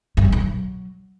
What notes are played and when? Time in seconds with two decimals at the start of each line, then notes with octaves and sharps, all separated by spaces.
0.17 G2
0.25 E2
0.32 G2
0.40 F#3